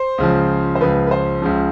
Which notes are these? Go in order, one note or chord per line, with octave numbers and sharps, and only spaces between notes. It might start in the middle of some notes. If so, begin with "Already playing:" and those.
Already playing: C5
C#2 C#3 F3
C5
C#2 C#3 F3 B4
B4
C5
C#2 C#3 F3